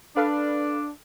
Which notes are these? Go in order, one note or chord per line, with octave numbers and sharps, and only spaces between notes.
D4 A4 B4 F5